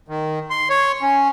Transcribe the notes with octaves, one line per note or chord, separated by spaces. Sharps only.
D#3
C6
C#5
C#4